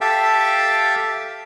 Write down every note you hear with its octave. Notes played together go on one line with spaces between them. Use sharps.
G4 A4 E5 F5 G5 A5